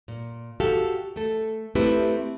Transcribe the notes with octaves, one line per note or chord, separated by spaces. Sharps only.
A#2
F#4 G4 A4 F5
A3 A4
A3 C4 E4 G4 B4